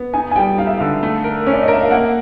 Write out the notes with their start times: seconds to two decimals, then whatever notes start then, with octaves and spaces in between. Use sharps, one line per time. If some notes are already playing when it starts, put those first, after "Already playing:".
Already playing: B3
0.14 D#4 G#5
0.31 G#5
0.36 G3 G5
0.58 D#4 F5
0.67 E5
0.78 D3 F5
1.03 A3
1.24 A#4
1.47 C#4
1.53 D5
1.63 D#5
1.68 A#4 E5
1.82 F5
1.91 A#3 F#5